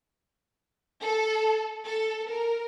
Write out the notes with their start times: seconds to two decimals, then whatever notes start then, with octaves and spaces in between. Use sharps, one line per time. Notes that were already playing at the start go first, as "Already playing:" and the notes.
1.02 A4
1.84 A4
2.30 A#4